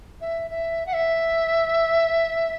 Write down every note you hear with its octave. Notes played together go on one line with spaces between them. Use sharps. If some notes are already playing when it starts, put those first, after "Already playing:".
E5
E5
F#5
E5